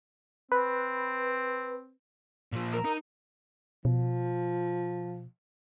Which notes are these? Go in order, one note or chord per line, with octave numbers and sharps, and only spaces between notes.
C4 B4
A#2 F3
A#4 A#5 E6
D#4
B2 F3